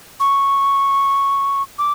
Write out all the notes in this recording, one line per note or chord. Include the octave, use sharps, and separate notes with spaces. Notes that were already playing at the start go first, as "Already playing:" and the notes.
C#6
D6